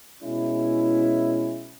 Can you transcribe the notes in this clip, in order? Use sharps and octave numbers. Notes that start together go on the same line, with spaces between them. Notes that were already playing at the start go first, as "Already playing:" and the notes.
B2 G#3 C#4 E4